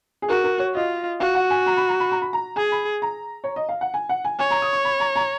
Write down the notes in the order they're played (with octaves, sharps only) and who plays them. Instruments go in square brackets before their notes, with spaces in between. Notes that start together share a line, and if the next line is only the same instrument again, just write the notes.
[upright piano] G#4
[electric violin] F#4 [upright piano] A#4
[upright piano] A#4
C#5
[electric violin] F4 [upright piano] D#5
[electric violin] F#4 [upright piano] F5
[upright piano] F#5
G#5
A#5
B5
A#5
B5
A#5
B5
A#5
[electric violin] G#4 [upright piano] G#5
[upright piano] B5
A#5
C#5
D#5
F5
F#5
G#5
F#5
G#5
[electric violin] C#5 [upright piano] G#5
[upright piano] A#5
D#6
C#6
B5
A#5
A#5